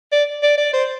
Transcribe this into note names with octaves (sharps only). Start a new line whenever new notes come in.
D5
D5
D5
C5